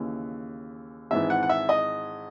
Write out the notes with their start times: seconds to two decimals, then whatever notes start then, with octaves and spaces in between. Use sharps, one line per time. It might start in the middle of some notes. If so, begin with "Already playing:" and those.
Already playing: D#2 C#3 E3
1.11 G#1 G#2 E3 E5
1.30 F#5
1.43 F#5
1.49 E5
1.69 D#5